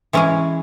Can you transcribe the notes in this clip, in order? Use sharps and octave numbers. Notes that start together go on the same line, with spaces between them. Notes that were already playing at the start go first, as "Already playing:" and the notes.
E3 G#3 C#4 G#4